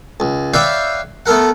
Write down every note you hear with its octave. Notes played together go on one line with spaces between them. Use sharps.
C#2
B4 C#5 D5 E5 F5 G5
A3 B3 A4 A#4 F#5